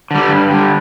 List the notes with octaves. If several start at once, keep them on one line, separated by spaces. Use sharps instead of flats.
D3 G3
G2
D3 G3